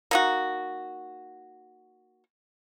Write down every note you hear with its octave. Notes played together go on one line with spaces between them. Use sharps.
A#3 D#4 F#4